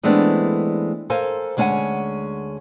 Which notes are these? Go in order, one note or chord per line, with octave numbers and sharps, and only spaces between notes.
E3 G#3 A3 B3 C4 D4
A4 A#4 C5 F5 G#5
D2 G#3 C#4 F5 F#5 G#5